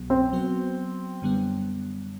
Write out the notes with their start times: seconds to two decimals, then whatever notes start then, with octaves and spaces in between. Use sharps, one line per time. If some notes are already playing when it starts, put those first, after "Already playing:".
Already playing: C2 B2 F#3 B3
0.10 C4
0.33 F#3 B3 F#4 C5
1.22 F#2 D3 G3 B3